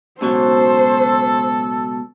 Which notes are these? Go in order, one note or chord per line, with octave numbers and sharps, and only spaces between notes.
C#2 B2 F#3 A4 C5